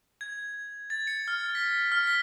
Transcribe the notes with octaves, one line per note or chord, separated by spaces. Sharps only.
G#6
A6
C#7
F6
B6
F6
B6